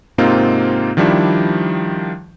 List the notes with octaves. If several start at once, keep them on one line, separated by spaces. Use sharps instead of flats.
G#2 C3 A#3 C4 D#4 F4
D#3 F3 G3 D4 E4